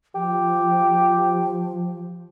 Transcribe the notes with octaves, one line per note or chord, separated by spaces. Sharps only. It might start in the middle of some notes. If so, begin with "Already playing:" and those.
F3 G4